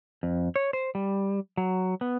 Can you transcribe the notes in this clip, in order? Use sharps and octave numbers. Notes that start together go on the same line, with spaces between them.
F2
C#5
C5
G3
F#3
B3